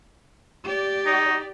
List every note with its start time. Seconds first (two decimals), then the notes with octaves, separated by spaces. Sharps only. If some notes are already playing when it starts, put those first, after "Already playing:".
0.64 G4 D5
1.06 D#4